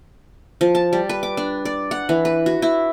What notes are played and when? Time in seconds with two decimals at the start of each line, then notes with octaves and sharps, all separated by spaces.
0.61 F3
0.75 A5
0.93 G3
1.09 B4
1.23 D6
1.37 D4
1.65 D5
1.91 F#5
2.09 E3
2.25 B4
2.46 F#4
2.62 E4